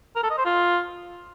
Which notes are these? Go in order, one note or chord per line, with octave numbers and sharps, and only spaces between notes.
A#4
A4
D#5
C5
F4